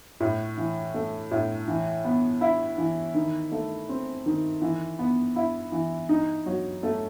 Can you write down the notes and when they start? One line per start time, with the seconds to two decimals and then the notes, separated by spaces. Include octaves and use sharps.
0.20 A2
0.58 E3
0.94 A3
1.31 A2
1.68 E3
2.05 B3
2.41 E4
2.78 E3
3.14 D#3
3.52 A3
3.89 C4
4.26 D#3
4.62 E3
4.99 B3
5.36 E4
5.72 E3
6.09 D#4
6.46 F#3
6.83 A3